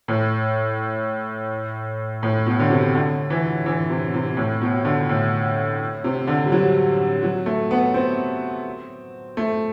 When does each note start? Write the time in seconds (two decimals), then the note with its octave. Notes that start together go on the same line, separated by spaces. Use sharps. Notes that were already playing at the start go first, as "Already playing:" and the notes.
0.08 A2
2.23 A2
2.46 B2
2.59 D3
2.70 C3
2.95 D3
3.30 E3
3.66 E3
3.90 C3
4.14 C3
4.37 A2
4.62 B2
4.85 D3
5.09 A2
6.04 C3
6.27 D3
6.46 G3
6.52 F#3
7.23 F#3
7.46 A3
7.71 B3
7.94 C4
9.37 A3